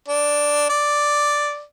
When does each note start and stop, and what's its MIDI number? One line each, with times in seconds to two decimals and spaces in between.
0.08 0.67 62
0.69 1.63 74